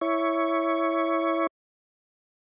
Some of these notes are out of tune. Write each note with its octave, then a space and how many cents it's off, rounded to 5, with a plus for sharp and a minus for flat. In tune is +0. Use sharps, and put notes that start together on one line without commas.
E4 +0 C#5 +5